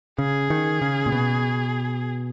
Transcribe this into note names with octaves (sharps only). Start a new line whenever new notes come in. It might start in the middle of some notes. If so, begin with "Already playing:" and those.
C#3 G#4
D#3
C#3
A#2
B2